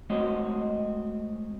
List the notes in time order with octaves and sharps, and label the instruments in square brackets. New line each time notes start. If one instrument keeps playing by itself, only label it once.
[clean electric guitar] G#3 A3 C4 F#4 C#5 D#5